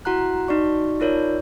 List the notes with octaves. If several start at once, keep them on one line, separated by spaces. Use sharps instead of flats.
E4 F#4 F#5 A#5 F#6
D#4 F#4 D5 C#6
D#4 F4 A#4 C#5 D5